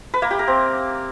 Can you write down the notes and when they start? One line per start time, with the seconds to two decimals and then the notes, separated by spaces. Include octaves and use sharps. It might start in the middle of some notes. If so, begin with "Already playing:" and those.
0.14 B4
0.22 A#3
0.31 G4
0.39 A#4
0.48 C4